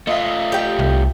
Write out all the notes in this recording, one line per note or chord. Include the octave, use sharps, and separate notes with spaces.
A3 F4 D#5 E5
G4 G5
C2